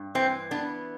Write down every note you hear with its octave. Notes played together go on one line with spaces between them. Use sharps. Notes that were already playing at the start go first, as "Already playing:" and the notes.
Already playing: G2
E3 C4
B3 D4